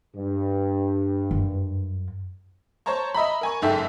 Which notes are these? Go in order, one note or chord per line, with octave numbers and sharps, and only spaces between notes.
G2
F#2
C5 C#5 A5 A#5 C#6
D#5 E5 A#5 B5
A#4 G#5 C#6
F#1 G#2 A4 E5 G5